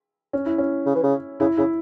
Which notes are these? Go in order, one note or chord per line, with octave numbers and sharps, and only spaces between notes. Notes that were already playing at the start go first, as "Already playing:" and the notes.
C#4
E4
C#4
C#3
E3
C#3
C#3 E4
C#3 E4